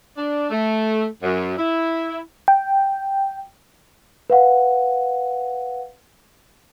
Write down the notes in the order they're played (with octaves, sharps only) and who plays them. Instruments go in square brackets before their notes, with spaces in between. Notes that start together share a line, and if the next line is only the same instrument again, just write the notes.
[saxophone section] D4
A3
F#2
E4
[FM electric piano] G5
[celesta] B4 F5 F#5